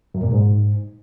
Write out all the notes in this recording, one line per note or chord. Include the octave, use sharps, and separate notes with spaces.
F#2
A#2
G#2